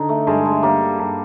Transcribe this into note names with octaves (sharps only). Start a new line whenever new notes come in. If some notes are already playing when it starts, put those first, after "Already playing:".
Already playing: D3 D#4
A3
G2 G#3
A3
G3 A#3
G2